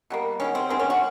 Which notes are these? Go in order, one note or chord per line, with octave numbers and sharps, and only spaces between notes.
B2 G3 A#3
D#3 G#3 B3 C#4
C4
D#3 G#3 B3 C4
C#4
F#4